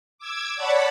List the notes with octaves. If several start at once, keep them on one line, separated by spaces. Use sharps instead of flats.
D6 E6 G#6
C#5 D5 F#5 A5 B5